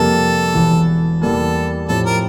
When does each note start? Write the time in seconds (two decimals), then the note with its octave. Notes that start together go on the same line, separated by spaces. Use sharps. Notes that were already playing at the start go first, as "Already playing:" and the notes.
Already playing: F2 C3 G3 A#3 A4
0.54 E1 E2 E3
1.22 E2 E3 G3 A#3 A4
1.88 A2 F3 C4 G4 A4
2.06 A#4